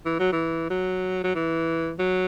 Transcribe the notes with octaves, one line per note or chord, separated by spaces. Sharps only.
E3
F#3
E3
F#3
F#3
E3
F#3